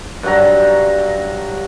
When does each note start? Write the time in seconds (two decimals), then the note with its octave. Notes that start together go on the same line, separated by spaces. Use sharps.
0.23 G2 F#3 A#5